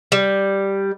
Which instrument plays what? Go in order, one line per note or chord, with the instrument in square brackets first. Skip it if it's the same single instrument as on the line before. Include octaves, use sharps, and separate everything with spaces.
[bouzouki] G3